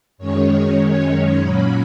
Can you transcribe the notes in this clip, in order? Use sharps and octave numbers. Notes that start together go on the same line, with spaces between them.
F#2 D#3 G#3 C#4 C#5
C#5
A#2 F#3 A#3 C#4 B5